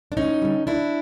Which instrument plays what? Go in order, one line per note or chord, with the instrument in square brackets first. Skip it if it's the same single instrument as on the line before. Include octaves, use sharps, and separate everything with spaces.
[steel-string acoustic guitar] D4
D2 C#4 D#4
D3 G3
D2 D4 E4